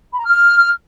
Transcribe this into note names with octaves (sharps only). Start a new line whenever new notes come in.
B5
A#5
F6